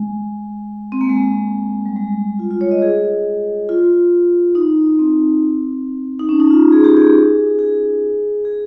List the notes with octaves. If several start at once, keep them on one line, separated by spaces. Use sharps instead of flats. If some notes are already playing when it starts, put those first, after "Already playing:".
Already playing: G#3
C4
A#3
G#3
G3
G#3
F4
F4
C#5
D#5
G#4
F4
D#4
C4
D#4
C#4
D#4
F4
G#4
G4
G#4
G#4
G#4